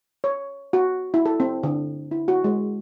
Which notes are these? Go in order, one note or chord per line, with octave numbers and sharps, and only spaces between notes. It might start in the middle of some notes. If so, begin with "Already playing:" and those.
C#5
F#4
E4
A4
C4
D3
E4
F#4
G#3